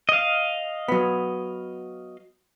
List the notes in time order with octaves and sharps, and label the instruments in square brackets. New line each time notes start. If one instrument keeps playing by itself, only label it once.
[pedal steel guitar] D#5 F5
[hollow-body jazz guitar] F#3 B3